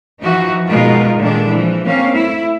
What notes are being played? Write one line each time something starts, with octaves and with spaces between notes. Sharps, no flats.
E3 F3 D#4 F#4
B2 G#3 D#4 F4 A#4
A#2 D3 D#3 G#3 D4
E3 F3
A#3 C4 C#4 F5
A3 E4